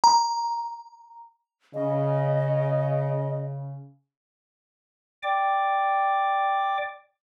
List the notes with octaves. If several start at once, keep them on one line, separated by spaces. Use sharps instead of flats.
A#5
C#3 D#5
D5 G5 D6